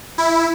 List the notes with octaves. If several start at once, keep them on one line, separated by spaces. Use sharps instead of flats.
E4